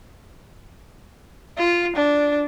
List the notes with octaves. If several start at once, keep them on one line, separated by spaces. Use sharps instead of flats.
F4
D4